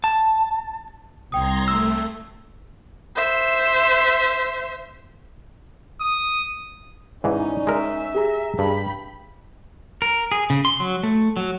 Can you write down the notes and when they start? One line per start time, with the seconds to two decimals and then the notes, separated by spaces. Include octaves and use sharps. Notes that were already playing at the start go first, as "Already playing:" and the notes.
0.04 A5
1.32 C2 G5 A#5 C6 D#6 G#6
1.68 A3 E6
3.15 C5 E5
6.01 D#6
7.24 G#2 E3 C#4 D#4 D5
7.67 G#3 A#4 E5
8.15 G4 G#4 A#5
8.59 G2 G5 B5
10.02 A#4
10.32 G#4
10.50 C#3
10.65 C6
10.80 F#3
11.03 A3
11.37 F#3